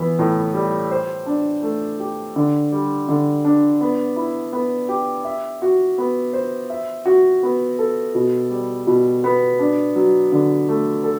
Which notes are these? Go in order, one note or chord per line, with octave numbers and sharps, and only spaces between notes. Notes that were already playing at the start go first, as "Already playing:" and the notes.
Already playing: E3 B3
A2
G3
C5
D4
A3
G4
D3
G3
D3
D4
B3
E4
B3
G4
E5
F#4
B3
C5
E5
F#4
B3
A4
B2
G3
B2
B3
D4
F#3
D3
A3
A4